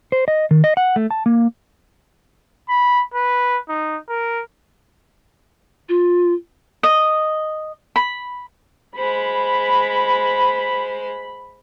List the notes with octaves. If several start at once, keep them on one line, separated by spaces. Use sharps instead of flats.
C5
D#5
D#3
D#5
F#5
A3
A5
A#3
B5
B4
D#4
A#4
F4
D#5
B5
G#3 C5 B5